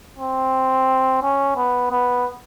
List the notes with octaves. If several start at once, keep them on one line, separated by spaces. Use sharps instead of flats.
C4
C#4
B3
B3